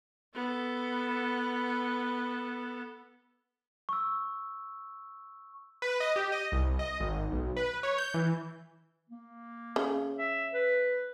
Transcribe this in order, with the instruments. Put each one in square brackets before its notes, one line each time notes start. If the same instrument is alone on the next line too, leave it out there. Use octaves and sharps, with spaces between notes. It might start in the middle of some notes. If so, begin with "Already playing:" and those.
[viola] B3 A4
[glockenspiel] C#6 E6
[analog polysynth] B4
D#5
G4
D#5
C2
D#5
G#1
B1
B4
C#5
G6
E3
[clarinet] A#3
[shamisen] C#3
[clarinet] E5
B4